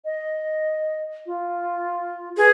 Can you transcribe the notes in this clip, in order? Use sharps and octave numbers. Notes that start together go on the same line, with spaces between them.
D#5
F4
G#4 B4